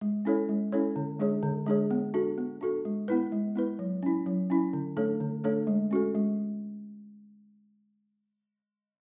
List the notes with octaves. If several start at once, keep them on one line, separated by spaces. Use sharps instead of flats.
G#3
C#4 E4 A4 C#5
G#3
C#4 E4 A4 C#5
D3
G#3 D4 G#4 C#5
D3
G#3 D4 G#4 C#5
B3
D4 F#4 A4
B3
D4 F#4 A4
G#3
B3 E4 B4
G#3
B3 E4 B4
F#3
C#4 E4
F#3
C#4 E4
D3
A3 D4 A4 C#5
D3
A3 D4 A4 C#5
G#3
C#4 F#4 A4
G#3